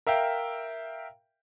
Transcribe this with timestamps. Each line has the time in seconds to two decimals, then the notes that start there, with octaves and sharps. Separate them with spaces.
0.07 A#4 E5 F5 G5